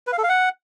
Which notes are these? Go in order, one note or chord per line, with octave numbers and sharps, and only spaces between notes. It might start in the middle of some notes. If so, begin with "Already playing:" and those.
B4
F5
A4
F5
F#5